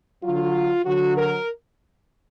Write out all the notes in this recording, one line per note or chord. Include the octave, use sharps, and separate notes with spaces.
D3 F#3 F4
D3 F#3 F#4
A#4